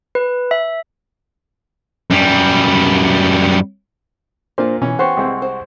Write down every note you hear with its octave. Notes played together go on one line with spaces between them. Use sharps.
B4
E5
F#2 G3
A#2 A#3 D4 F4 A#4 C5
B2 E3 C#4
B3 G4 C5 F#5 C6 C#6
C2 G#3 C4
C5